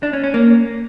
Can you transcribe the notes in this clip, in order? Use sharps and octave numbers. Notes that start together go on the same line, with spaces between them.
D4
C#4
C#4
A#3